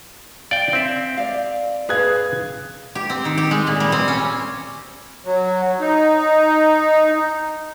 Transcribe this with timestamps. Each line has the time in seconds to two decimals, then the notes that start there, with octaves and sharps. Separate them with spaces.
0.51 D5 F5 G5
0.73 C4 E5
1.17 D5 F5
1.89 G#4 B4 F5 F#6 G#6
2.95 G4
3.10 C4
3.25 D#3
3.38 G4
3.51 G#3
3.67 A#2
3.80 G3
3.92 C4
4.08 C#4
5.25 F#3
5.80 D#4